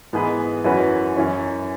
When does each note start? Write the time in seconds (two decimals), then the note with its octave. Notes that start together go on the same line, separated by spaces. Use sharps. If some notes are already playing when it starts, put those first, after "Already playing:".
0.13 G#2 E3 B3 G#4 B4
0.64 F#2 E3 C#4 F#4 B4
1.17 F#2 E3 C#4